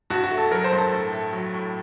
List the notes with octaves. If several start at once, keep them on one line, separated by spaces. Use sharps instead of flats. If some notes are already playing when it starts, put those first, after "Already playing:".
G2 F#4
F#4
A3
A4
F#3 A#4
C5
G2
A4
A2 A4
A3
F#3
A2